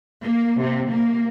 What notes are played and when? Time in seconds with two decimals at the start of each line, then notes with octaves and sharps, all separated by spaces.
0.22 A#3
0.60 C3
0.90 A#3